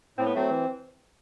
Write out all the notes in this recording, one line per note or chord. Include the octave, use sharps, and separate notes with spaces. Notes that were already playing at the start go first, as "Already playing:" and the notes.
A2 C4
B3
F#3 A3 C4
E3